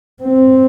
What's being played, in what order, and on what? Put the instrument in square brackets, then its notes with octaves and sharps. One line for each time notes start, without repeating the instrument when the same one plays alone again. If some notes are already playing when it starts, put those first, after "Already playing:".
[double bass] C4